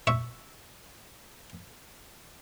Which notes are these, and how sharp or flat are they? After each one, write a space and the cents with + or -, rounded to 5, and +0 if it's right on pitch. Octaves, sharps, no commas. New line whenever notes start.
E5 +0 C#6 +0